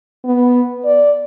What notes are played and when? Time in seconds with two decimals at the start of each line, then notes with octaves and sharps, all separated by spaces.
0.25 B3
0.85 D5